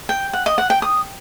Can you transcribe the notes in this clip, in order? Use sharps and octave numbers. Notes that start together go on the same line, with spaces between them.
G5
F#5
D#5
F#5
G5
D#6